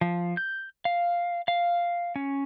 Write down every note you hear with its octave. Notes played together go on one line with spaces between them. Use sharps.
F3
G6
F5
F5
C#4